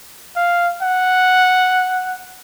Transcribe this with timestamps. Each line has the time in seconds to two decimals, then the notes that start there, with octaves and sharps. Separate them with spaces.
0.36 F5
0.82 F#5